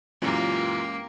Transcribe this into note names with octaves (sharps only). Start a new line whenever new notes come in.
F#2 A#2 E3 G#3 A#3 C#4 F4 G4